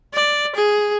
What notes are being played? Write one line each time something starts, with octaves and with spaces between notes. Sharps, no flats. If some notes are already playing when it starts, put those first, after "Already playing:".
D5
G#4